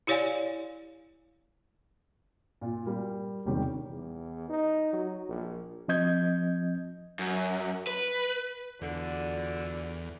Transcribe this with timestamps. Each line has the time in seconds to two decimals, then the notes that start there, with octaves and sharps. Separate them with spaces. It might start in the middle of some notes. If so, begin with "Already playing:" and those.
0.07 E4 G4 C#5 D5 F5 G#5
2.61 A#2 F4
2.86 G3 A#4
3.46 E1 C3 D#3 G3 G4 C#5
3.89 E2
4.49 D#4
4.93 F#3
5.28 A#1
5.88 F3 C4 D#5 G6 G#6
7.19 F#2
7.87 B4
8.81 E2 D3 F4 F#4 D5